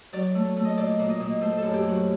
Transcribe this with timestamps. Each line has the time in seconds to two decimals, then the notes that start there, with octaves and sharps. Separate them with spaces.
0.13 F#3 D5
0.35 A3
0.56 A3
0.65 D#5
0.77 A#2 D5
0.99 A#2
1.10 D#5
1.20 A#2
1.41 A3 C5
1.58 F#2 A4
1.74 G4
1.84 F#3 F#4